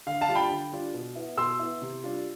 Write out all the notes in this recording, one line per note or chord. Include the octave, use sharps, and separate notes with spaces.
D3 F5
F5 A5
G3 D4 F4
G5 B5
D3
G3 D4 F4
B2
B3 E4
B2 C6 E6
B3 E4
C3
G3 D4 F4